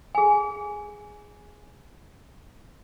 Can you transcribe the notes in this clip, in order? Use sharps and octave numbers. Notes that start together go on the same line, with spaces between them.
G#4 G#5